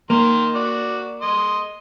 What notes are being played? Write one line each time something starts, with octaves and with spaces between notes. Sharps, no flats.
D#3 A#3 A#5 C6
F#4 D5
D#5 C6